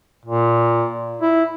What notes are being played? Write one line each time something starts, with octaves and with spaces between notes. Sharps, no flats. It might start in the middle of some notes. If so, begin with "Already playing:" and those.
A#2
E4